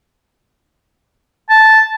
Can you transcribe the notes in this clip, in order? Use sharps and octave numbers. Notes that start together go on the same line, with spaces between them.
A5